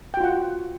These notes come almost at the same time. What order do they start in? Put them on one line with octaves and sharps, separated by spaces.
G5 F#4 F4 F#5